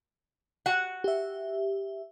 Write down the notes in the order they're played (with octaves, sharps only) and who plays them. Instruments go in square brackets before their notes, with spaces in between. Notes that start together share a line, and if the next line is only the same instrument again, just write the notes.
[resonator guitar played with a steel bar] F#4 F#5
[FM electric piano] G4 E5